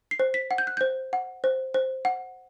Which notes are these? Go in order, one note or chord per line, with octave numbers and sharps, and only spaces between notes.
C7
C5
B6
F#5
G6
F#6
C5 G6
F#5
C5
C5
F#5